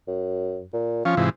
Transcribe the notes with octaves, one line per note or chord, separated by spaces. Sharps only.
F#2
A#2
F3 C#4 F4
G#2 C3 E3